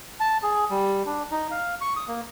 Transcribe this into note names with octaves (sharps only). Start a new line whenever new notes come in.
A5
G#4
G3
D4
D#4
F5
C#6
D#6
A#3